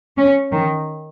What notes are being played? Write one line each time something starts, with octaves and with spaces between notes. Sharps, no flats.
C#4
D#3